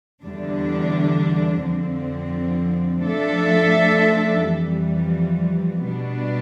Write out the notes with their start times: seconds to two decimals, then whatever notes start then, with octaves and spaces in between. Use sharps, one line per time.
0.22 E2 D3 G3 D4
1.63 F2 D3 F3 C4
3.03 F3 A3 D4 A4 E5
4.44 F2 E3 G3
5.85 B2 G3 B3 D4